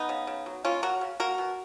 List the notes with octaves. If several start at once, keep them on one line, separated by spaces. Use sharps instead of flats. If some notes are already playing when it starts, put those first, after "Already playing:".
Already playing: B3 D#4
C#3
C#3
F#3
A#3 C#4 F4
F#3 F#4 A#4
C#3
A#3 F#4 A#4
B2